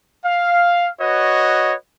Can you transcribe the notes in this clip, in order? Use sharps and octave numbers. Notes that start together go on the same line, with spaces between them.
F5
F#4 B4 C#5 D#5